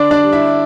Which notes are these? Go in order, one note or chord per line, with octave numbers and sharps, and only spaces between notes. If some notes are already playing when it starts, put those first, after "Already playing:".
Already playing: D3 D4 D5
D4 D5
G3
E4 E5